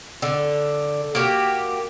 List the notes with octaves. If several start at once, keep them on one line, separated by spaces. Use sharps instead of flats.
D3
A#3 F#4 G4